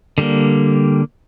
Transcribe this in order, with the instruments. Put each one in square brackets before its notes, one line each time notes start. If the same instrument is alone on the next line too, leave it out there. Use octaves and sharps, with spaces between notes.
[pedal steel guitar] D3 G3 A#3